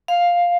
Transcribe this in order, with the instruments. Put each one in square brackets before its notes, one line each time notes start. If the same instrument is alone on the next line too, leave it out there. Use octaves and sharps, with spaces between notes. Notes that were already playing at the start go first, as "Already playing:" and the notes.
[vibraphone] F5